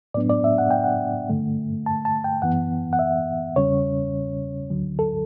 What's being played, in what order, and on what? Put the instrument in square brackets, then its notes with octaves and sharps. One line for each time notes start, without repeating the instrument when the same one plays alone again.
[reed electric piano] A2 F#3 B3 D4 D5
D5
E5
F#5
G5
F#5
G2 D3 A3
A5
A5
G5
F#2 E3 B3 F#5
F#5
E5
E2 C#3 G3 C#4 C#5
D2 D3 F#3
A4